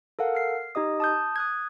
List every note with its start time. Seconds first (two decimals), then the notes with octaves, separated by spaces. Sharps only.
0.19 A4 A#4 F5 F#5
0.35 F6 C7
0.75 D#4 G4 D#5 D#6
1.00 A5 D#6 G6
1.36 D#6 F#6 G#6